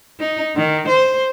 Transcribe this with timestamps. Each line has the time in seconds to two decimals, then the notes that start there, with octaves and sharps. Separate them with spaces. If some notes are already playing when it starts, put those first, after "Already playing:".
0.20 D#4
0.56 D#3
0.89 C5